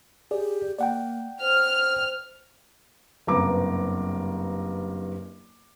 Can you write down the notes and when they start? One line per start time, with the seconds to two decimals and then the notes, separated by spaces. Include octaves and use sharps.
0.31 G4 G#4 D5
0.78 A#3 D5 F#5 G5
1.41 C5 F6
3.27 F#1 G2 C3 B3 A#5 D6